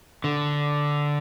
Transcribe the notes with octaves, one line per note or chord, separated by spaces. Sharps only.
D3